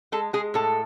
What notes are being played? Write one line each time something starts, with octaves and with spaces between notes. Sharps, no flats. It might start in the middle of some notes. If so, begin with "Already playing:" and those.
G#3 A4
G#3 G#4
A2 A4